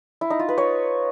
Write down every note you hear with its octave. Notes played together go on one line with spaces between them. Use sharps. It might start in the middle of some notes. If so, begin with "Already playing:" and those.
E4
D#4
F4
B4
C#5